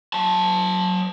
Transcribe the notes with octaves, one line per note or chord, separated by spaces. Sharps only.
F#3 A5